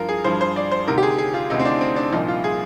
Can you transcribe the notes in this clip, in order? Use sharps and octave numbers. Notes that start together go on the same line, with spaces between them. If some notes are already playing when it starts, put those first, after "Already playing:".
Already playing: G2 F3 F4 A#4
G#4
G2 F3 C5
C5
D5
C5
D2 C3 D#3 A#4
G4
G#4
G#4
F4
D2 C3 D#3 D#4
C4
D4
C4
D4
C2 A#2 F3 D#4
F4
G#4